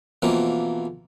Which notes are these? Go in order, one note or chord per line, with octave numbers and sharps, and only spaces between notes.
F2 B2 E3 F3 A#3